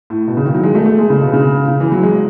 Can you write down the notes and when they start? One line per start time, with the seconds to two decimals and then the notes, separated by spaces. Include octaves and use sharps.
0.10 A2
0.28 B2
0.37 C#3
0.45 D#3
0.54 F#3
0.63 G#3
0.75 A3
0.86 A3
0.99 G#3
1.10 C#3
1.22 B2
1.33 C#3
1.68 C#3
1.80 E3
1.92 F#3
2.03 G#3